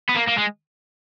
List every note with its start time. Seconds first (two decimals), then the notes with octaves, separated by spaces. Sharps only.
0.09 B3
0.15 A#3
0.27 A#3
0.38 G#3